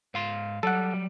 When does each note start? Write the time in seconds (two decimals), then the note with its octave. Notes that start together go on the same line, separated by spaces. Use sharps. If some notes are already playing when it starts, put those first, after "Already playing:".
0.14 G#2 F5 C6
0.63 F#3 G3 A4 F#5